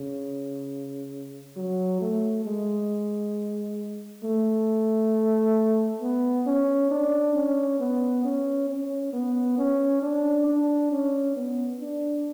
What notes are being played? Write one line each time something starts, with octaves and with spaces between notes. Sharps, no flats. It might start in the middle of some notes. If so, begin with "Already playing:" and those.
Already playing: C#3
F#3
A3
G#3
A3
B3
C#4
D4
C#4
B3
C#4
C#4
B3
C#4
D4
D4
C#4
B3
D4